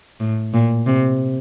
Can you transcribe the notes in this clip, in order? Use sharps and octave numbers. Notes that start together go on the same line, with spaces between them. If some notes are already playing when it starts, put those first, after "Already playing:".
A2
A#2
C3